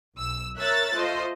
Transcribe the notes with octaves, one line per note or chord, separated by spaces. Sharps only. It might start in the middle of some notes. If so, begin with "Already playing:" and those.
B1 E6
A#4 C#5 E5 E6 F#6 A6
A3 F4 C5 D#5